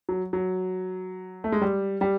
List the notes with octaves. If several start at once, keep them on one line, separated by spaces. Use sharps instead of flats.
F#3
F#3
A3
G#3
G3
G3